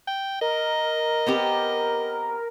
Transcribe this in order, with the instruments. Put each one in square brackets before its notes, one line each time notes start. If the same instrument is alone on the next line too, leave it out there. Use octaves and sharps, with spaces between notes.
[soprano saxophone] G5
[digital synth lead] A#4 [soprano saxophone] D#5
[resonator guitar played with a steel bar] B3 C4 G4